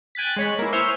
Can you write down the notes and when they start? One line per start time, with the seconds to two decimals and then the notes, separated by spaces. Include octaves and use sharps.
0.15 G5 G#5 F#6 A6 B6
0.36 G#3 C#5 B5
0.59 A#3 E4
0.73 C5 C#5 E5 G#5 C6 F6